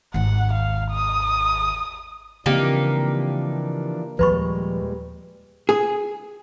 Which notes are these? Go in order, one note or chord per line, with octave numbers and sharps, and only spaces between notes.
G#1 D#2 F#5
F5
D#6
C#3 E3 F3 A#3 C4 D4 D#4 G4
D#2 A#2 F3 G3 G#3 B4 B5 C#6
G#4